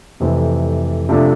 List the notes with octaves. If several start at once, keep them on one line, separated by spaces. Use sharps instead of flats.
F2 C3 E3 A3 C4
C3 F3 A3 D4